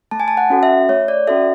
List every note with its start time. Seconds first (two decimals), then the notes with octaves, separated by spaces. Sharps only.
0.11 A3 A5
0.20 G#5
0.28 A5
0.37 F#5
0.50 C#4 F#4 A4
0.63 E5
0.89 A3 C#5
1.08 D5
1.27 C#4 F#4 A4 E5